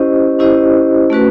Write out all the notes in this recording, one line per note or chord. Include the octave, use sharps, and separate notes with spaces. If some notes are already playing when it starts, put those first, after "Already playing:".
Already playing: C#4 E4 G4 C5 D#5
C#4 E4 G4 C5 D#5
A3 C#4 F#4 B4